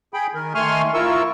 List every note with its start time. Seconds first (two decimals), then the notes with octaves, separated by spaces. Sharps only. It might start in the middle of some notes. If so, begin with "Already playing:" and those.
0.14 G#4 G5 B5
0.35 D#3 A#4
0.55 D#3 A3 G#5 C6 C#6 F6
0.94 E4 F4 A#4 C#6 E6